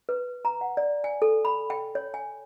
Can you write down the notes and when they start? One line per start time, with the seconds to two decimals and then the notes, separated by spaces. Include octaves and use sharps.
0.09 B4
0.45 A#5
0.61 F#5
0.77 D5
1.04 G#5
1.22 A4
1.45 B5
1.70 G5
1.95 C#5
2.14 G#5